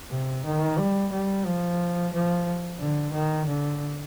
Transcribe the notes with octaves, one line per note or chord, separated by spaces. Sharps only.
C3
D#3
G3
G3
F3
F3
D3
D#3
D3